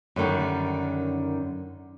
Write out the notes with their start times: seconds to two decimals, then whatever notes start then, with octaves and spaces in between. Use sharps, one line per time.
0.16 F#2 D3 D#3 G3